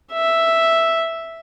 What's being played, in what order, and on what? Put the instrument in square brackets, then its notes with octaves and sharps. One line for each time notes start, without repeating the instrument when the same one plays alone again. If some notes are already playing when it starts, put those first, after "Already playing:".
[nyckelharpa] E5